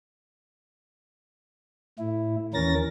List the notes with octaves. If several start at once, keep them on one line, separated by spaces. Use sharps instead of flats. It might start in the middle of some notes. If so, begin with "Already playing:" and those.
A2 E4
D#2 E3 C#4 A#4 A6 A#6